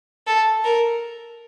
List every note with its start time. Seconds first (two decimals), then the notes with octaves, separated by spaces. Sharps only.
0.27 A4
0.65 A#4